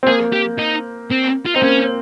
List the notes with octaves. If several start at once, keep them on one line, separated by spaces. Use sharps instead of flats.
C4
A#3 G#4
G4
D#4
C4
F4
C4 D#4
A#3 C#4